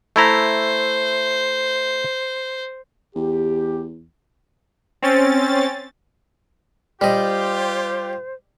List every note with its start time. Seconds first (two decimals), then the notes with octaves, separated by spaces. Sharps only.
0.16 A3 E4 C5 A#5
3.16 E2 G4
5.02 C4 C#4 A6
7.01 G3 F4 G4 C5 D#5